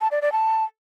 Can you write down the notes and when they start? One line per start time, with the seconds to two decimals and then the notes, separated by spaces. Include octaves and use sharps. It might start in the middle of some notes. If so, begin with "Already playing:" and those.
0.01 A5
0.11 D5
0.22 D5
0.32 A5